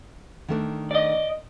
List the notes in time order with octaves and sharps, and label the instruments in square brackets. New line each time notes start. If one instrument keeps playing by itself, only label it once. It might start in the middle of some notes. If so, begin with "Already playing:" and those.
[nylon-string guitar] D#3 A3 D4
[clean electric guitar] D5 D#5